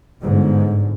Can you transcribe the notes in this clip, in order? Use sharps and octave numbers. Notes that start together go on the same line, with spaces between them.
G1 G#2 D3